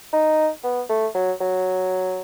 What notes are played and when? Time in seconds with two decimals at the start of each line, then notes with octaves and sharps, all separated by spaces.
0.13 D#4
0.64 B3
0.89 A3
1.15 F#3
1.41 F#3